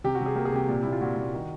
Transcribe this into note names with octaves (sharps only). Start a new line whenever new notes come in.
C3 G4
F#4
C3
G#4
A#3 G4
G#4
C3 G4
A#2
A#2 E4
F4
A#2 F#4
A#2
D#3